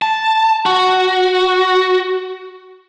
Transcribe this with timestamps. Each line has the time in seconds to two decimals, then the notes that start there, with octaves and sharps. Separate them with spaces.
0.02 A5
0.66 F#4